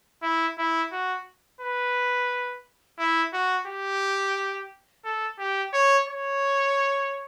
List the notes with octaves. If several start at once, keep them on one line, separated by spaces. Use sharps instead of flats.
E4
E4
F#4
B4
E4
F#4
G4
A4
G4
C#5
C#5